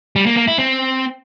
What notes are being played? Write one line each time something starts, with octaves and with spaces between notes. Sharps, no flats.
G3
A#3
A#3
E4
C4